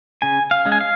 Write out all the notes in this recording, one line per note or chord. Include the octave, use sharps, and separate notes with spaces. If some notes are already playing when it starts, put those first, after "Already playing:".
C#3 G#5
F5
G#3 C#4
G#5
F5